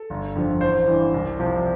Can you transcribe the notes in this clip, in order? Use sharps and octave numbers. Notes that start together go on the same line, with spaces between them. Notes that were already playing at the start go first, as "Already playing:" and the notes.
Already playing: A4
G1
F2 D3 F3
A1 C5
G2 E3
C2
C3 F3